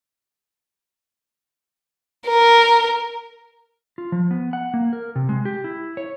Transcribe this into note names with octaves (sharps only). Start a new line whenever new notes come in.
A#4
F4
F3
B3
F#5
A#3
A#4
C3
G#3
G4
E4
C#5